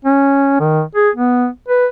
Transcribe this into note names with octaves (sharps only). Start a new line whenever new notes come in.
C#4
D#3
G#4
B3
B4